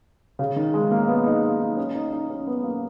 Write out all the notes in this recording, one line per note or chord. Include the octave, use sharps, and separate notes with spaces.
C#3
D#3
G#3
A#3
B3
D#4
D#4
D#4
C#4
D#4
D#4
C#4
B3
A#3